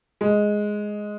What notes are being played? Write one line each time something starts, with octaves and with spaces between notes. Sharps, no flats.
G#3